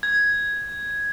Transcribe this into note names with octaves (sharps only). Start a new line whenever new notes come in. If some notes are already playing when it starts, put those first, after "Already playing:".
G#6